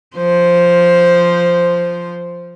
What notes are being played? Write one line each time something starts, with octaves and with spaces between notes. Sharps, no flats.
F3 C5